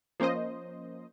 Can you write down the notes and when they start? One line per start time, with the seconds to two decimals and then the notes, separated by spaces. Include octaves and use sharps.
0.20 F3 A#3 C#4 C5 D#5